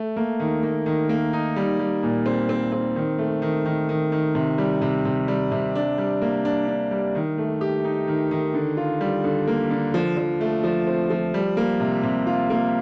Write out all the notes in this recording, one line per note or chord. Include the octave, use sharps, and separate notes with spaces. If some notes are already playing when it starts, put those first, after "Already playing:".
Already playing: A3
A#3
D#3
A#3
D#3
A#3
D#4
G3
G3
A#2
C4
C4
C4
D#3
A3
D#3
D#3
D#3
D#3
C3
G3
C3
C3
G3
C3
D4
G3
A#3
D4
D4
G3
D#3
A3
G4
D#4
D#3
D#3
D3
F4
G3
D3
A#3
D3
F3
F3
A3
F3
C4
F3
G3
A#3
C3
C3
F4
A#3